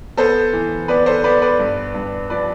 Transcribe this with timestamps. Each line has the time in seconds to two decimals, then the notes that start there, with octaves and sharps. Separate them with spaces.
0.17 B3 A4 C5
0.53 E3
0.88 B3 B4 D5
1.06 A4 C5
1.24 B3 B4 D5
1.42 B4 D5
1.59 G2
1.94 G2
2.30 F3 B4 D5